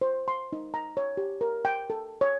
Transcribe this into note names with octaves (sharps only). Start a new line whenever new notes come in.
C5
C6
D#4
A#5
C#5
G4
A#4
G5
A4
C#5